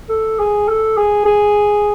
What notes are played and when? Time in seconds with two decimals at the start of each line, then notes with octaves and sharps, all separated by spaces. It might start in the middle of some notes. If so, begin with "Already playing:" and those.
0.09 A4
0.39 G#4
0.68 A4
0.97 G#4
1.25 G#4